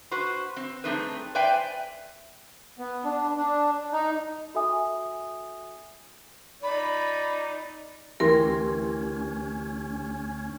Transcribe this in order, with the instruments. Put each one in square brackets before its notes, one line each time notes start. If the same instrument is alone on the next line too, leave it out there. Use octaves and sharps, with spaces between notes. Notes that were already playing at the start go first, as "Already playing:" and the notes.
[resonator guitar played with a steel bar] F#4 B4 C5
C4
G3 A3 C4 D#4 G#4 B4
B4 C5 D5 E5 G5 G#5
[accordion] B3
D4
D4
D#4
[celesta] F#4 A4 E5 G#5 D#6
[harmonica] D#4 D5 [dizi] B5
[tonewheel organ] D2 C#4 [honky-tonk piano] E3 C6 [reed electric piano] G4 [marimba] A#4